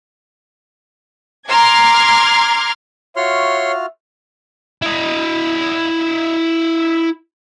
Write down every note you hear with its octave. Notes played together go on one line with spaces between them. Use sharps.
A#5 C6 D6 F6 G#6
F4 F#4 C#5 E5 C6 F6
E4 D#5